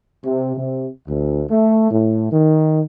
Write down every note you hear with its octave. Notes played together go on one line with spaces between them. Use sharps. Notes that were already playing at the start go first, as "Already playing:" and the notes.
C3
C3
D2
A3
A2
D#3